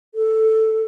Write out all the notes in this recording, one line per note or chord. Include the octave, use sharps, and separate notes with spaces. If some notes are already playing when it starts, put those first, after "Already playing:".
A4